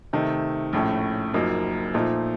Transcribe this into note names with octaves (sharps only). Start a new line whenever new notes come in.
C3 D#3 A3
A#1 A2 A3 C#4
F#1 F#2 F3 A#3 D#4
A#2 F3 A3 D#4